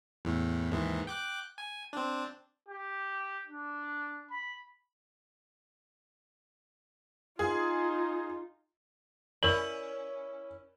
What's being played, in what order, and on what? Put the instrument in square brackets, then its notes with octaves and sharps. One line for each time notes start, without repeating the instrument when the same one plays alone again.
[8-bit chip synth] E2 A2
D#2 G#2 E3
G5 D6 F#6
G#5
C4 D4
[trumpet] G4
D4
B5
[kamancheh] D#4 F4 [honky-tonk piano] G#4
[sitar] C#4 E4 [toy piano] A#4 D5 [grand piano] F#7